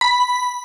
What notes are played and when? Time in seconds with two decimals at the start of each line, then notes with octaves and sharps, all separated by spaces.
0.01 B5